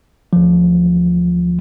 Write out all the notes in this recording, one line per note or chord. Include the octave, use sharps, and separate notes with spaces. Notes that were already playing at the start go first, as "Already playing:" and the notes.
D2 F3